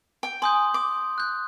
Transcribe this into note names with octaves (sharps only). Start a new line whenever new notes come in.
G5
G#5 C6 D#6 G6
D6
F#6 G6